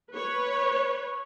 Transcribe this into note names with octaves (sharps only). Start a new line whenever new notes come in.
B4 C#5